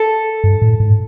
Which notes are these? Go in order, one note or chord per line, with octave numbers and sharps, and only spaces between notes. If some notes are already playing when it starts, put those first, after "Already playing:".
Already playing: A4
G2
A2
G#2